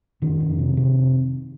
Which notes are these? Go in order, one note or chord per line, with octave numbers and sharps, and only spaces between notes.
F1 D#3
F1
C3
C3